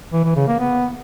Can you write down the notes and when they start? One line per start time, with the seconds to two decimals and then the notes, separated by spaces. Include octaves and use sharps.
0.13 E3
0.24 E3
0.36 C#3
0.47 A#3
0.59 B3